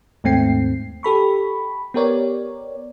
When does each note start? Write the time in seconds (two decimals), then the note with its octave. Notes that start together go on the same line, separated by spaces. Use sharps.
0.24 D#2 G#2 A3 C4 G5 C7
1.03 G4 A4 B5 C#6
1.94 B3 G4 A#4 C#5 D5